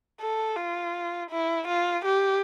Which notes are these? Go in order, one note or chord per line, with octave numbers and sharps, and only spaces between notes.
A4
F4
E4
F4
G4